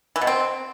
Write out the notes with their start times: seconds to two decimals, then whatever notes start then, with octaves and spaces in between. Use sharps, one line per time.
0.16 E3
0.21 B2
0.27 C4